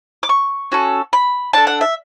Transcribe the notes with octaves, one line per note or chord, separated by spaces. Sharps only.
D6
C#6
C#4 F#4 A4
B5
D4 A4 A5
F#5
E5